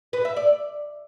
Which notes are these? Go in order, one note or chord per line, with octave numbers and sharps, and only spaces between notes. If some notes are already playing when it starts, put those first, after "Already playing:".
B4
E5
D5